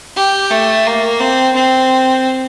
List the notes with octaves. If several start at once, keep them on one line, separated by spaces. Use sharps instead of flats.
G4
A3
A#3
C4
C4